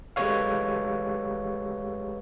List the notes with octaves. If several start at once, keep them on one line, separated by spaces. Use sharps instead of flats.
G#3 A3 G4 B4 C#5 F5